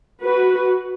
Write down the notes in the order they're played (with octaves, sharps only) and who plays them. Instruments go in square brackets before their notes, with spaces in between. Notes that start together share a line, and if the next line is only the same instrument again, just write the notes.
[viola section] F#4 B4